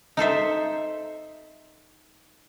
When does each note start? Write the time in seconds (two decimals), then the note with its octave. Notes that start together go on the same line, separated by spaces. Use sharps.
0.17 D#4 A4 C5 E5